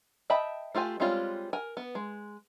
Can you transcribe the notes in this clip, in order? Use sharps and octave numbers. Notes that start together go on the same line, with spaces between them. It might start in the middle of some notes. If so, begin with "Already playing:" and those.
D#5 E5 G5 A5 B5
A3 F4 G4 G#5
G3 G#3 C4 C#4 F4
A#4 G#5
B3
G#3